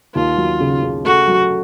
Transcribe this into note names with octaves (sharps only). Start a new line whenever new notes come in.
D#2 F4
F#3
C#3
C#3
A3 F#4
F#3